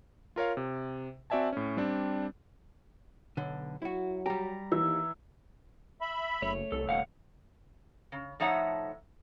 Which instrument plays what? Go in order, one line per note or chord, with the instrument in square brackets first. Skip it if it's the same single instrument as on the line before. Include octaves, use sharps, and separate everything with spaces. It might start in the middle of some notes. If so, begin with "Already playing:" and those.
[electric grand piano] F4 A#4 C#5 F5
C3
C4 F#4 D5 E5 G#5 A5
A2 C#4
G3 C4 D4
[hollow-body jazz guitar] B1 D3
[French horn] F#3 [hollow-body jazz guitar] E4 F#4
[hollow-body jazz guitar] G3 G4 [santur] A#5
[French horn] D#2 [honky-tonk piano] E3 [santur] E5
[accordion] E5 B5
[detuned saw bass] F#1 [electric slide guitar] A3 C#5
[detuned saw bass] C2 [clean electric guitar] A4
[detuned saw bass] D#1 [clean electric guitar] C2 F5 F#5 [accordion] B2
[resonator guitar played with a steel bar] C#3
A2 F3 D#4 C#5 E5 F#5